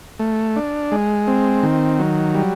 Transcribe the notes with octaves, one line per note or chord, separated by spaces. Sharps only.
A3
D4
G#3
C4
D#3
F#3
G3